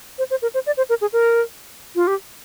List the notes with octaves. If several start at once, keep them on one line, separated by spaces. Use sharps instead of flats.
C5
C5
A#4
C5
D5
C5
A#4
G#4
A#4
F4
G4